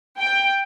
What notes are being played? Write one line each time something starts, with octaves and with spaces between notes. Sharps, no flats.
G5